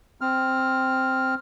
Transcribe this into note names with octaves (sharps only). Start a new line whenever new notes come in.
C4 F6